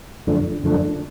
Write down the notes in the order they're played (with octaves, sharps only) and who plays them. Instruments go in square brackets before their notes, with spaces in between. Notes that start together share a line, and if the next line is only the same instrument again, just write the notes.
[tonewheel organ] F#2 D3 F3 A3 D4
F#2 D3 F3 A3 D4